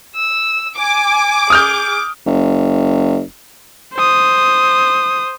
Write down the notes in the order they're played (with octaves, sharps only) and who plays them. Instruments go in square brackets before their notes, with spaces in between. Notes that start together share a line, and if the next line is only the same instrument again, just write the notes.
[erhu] E6
[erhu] G#5 [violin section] D6
[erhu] G#4 [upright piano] D#6 F6 G6
[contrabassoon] F#1
[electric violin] C5 D#6